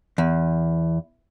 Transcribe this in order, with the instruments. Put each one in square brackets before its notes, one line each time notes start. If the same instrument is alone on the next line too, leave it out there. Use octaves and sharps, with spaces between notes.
[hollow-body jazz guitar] E2